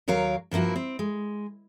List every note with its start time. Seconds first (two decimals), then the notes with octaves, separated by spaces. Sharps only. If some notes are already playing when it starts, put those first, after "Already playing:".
0.08 D#2 F#3 A#4 C#5 F5
0.51 G2 F3 A#3 E4 F#4
0.76 C4
0.99 G#3